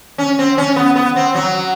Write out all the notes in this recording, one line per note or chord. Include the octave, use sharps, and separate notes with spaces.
C#4
C4
C#4
B3
B3
C4
F#3